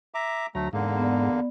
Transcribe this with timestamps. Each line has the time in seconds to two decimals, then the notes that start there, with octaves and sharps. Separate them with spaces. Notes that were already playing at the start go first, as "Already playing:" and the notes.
0.14 E5 A#5 D6
0.55 D2 F#3 A3 A#5
0.73 E2 G#2 D3 A#3
0.97 B3 D5